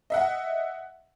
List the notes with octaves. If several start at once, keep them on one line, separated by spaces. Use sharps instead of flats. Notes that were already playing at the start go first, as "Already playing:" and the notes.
D#5 E5 F#5